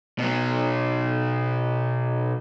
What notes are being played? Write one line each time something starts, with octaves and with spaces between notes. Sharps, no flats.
B2 F#3